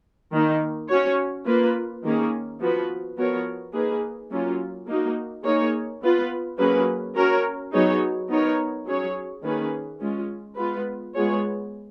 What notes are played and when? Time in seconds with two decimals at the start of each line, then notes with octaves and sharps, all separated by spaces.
0.32 D#3 A#3 D#4
0.89 C#4 F#4 C#5
1.46 A#3 F4 B4
2.04 D#3 A#3 C#4 G#4
2.61 F3 B3 F#4 B4
3.17 F3 B3 F#4 A#4 C#5
3.73 A#3 D#4 G#4 B4
4.31 F#3 A#3 C#4 F4
4.87 A#3 D#4 F#4
5.44 A#3 D#4 G#4 C#5
6.02 B3 F4 B4
6.58 F#3 A#3 C#4 G#4 B4
7.16 C#4 F#4 A#4 C#5
7.73 F#3 B3 D#4 G#4 C#5
8.29 B3 D#4 A#4 C#5
8.86 F#3 C#4 G#4 C#5
9.43 D#3 A#3 C#4 G#4 B4
10.00 G#3 C#4 F4
10.57 G#3 B3 F4 B4
11.15 G#3 B3 F4 G#4 C#5